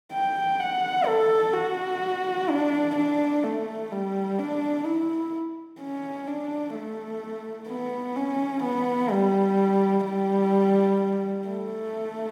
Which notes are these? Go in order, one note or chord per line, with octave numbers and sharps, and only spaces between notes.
G5
F#5
A4
F#4
D4
D4
A3
G3
D4
E4
C#4
D4
A3
B3
C#4
B3
G3
G3
A3